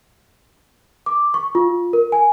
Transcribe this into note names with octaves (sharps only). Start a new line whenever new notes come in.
D6
C#6
F4
A#4
G#5